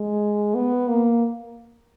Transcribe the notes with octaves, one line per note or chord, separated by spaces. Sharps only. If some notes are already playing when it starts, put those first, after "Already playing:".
Already playing: G#3
B3
A#3